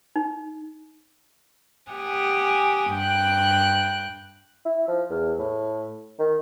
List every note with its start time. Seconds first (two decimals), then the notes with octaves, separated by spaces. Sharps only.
0.16 D#4
1.92 G4 F#5 G#5 D#6
2.92 G2 G5 F#6
4.65 E4
4.88 F3
5.10 E2
5.39 A2
6.19 D#3